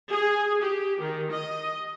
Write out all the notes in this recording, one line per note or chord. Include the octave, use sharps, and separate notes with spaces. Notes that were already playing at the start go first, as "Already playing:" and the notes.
G#4
G4
D#3
D#5